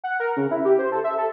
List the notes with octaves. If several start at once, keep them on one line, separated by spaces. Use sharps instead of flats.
F#5
A#4
C#3
E4
G4
C5
A4
E5
A4